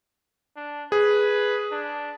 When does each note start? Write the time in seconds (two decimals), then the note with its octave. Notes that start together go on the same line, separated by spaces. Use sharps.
0.56 D4
0.92 G#4 B4
1.72 D4